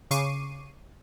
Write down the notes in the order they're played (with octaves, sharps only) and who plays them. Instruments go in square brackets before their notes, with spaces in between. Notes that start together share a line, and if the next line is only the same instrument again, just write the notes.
[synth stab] C#3 C#6 D6 C7 D#7